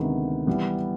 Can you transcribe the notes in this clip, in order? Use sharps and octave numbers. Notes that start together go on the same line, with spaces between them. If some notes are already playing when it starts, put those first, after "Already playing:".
Already playing: D2 C3 D#3 G#3 B3
E3 G3 B3